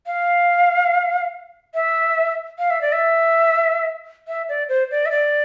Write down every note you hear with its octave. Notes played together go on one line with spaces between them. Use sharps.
F5
E5
F5
E5
D5
E5
E5
D5
C5
D5
E5
D5